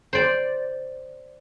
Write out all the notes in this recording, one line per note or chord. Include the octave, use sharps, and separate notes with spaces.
C5 D5